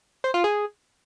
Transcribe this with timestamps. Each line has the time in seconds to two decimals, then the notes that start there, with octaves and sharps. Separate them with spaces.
0.24 C5
0.34 F4
0.44 G#4